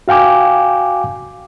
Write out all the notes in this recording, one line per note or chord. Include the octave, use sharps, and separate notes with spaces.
F#4 F5 G5 G#5 D6